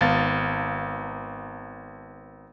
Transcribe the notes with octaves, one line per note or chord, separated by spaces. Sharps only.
G#1 B3 F5 A6